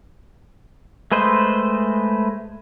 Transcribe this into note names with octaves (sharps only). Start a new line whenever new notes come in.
G#3 A3 B4 C5 D#5